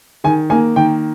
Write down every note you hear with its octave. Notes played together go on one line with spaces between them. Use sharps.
D#3 G#5
A#3 G#5
D#3 G5